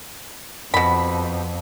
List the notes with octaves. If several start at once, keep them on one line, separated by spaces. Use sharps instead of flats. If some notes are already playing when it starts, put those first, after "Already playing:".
F2 B2 B5